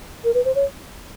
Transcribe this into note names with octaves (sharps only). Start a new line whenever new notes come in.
A#4
B4
C5
C#5